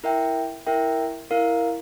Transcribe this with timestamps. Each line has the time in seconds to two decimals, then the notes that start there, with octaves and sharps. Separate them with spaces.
0.04 E4 A#4 E5 G5
0.66 E4 A#4 E5 G5
1.31 E4 A#4 F5